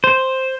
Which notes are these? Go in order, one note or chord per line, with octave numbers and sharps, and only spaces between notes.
C5